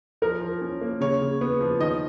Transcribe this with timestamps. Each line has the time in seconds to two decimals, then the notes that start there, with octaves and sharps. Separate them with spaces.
0.22 F3 A#4
0.41 F3
0.61 C#4
0.81 A#3
1.01 C#3 C#5
1.21 C#3
1.41 B3
1.61 F3
1.80 D#3 D#5